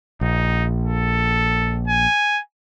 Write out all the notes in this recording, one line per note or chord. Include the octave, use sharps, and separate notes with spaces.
A#1 D#4
A4
G#5